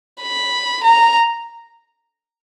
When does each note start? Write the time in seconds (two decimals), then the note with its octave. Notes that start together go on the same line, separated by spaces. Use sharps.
0.22 B5
0.84 A#5